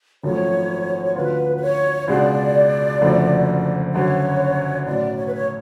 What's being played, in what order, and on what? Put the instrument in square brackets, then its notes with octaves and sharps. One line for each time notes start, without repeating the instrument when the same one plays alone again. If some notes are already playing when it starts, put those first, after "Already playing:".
[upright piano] G#1 F#2 F3 A3 [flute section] C#5
[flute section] C#5
[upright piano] D2 D3 F#3 C#4 F4 [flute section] B4
[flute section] B4
C#5
[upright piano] C#2 B2 G#3 D4 F#4 [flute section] D5
[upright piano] F#1 F2 D3 F#3 A3
[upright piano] F#1 F#2 D3 F#3 C#4 [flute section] C#5
[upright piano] B1 A2 F#3 C#4 F#4 [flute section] D5
[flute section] C#5
B4
C#5